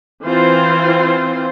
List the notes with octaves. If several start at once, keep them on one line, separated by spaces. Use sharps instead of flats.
E3 C4 F4 C5